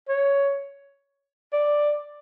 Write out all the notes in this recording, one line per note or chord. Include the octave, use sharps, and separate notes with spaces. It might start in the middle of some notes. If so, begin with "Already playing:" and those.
C#5
D5